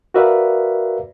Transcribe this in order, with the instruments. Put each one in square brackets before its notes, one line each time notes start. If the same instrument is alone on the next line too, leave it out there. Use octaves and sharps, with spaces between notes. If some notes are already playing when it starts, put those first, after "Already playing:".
[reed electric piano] F#4 A#4 B4 D5 E5 F5